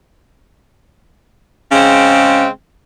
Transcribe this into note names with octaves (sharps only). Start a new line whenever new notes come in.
C#3 G#3 C4